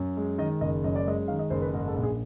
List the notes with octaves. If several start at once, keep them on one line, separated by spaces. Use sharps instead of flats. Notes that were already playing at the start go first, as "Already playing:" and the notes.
Already playing: F#2
G#3
D#3 D#5
F#1 D#5
F#2 D#5
D5
G#3 D#5
D#3 F5
D#5
F#1 C5
B4
G#2 A#4
A4
A#1
G#4